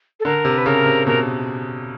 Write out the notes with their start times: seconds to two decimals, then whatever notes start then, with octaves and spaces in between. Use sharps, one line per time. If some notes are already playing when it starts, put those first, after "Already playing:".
0.19 A4
0.25 D3 A#4
0.45 C3
0.57 B4
0.66 C#3 A#4
0.86 C3
1.06 B2 A#4